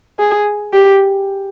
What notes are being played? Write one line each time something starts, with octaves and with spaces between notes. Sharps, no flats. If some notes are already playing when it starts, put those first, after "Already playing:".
G#4
G4